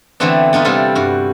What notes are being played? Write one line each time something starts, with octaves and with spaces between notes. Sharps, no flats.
D3 E3 A3 B3 C4 D4
B3 D4 D#4 F4
C3 G3 E4 F4 A4
G2 F#4